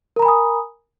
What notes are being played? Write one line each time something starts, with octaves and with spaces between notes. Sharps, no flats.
A#4 G#5 A#5 B5 D#6